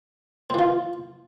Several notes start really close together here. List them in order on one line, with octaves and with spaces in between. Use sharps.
C4 E3 F4